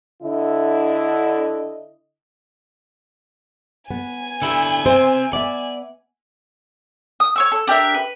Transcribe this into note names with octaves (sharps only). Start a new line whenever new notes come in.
D3 E4 D#5
B3 G#5
D3 E4 G4
C4 C5 E5
B3 D5 E5
D#6
C#5 C#6 E6
A4
D4 G4 A#4 E5
B4